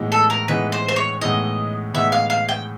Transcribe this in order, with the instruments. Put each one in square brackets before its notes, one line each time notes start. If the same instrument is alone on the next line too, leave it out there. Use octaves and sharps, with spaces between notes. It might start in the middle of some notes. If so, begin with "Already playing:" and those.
Already playing: [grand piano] A2 E3 G#3 B3 D#4
[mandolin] A4
A#4
[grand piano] A2 E3 G#3 B3 D#4 [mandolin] B4
[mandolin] C5
C5
C#5
[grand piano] A2 E3 G#3 B3 D#4 [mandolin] D#5
[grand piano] A2 E3 G#3 B3 D#4 [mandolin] E5
[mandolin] F5
F5
G5